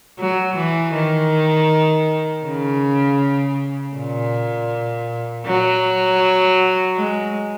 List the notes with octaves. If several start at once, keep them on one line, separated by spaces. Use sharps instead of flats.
F#3
E3
D#3
C#3
A#2
F#3
G#3